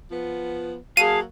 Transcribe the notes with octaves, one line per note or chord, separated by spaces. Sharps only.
F3 B3
F#3 A#3 G#4 F5 A5 D#7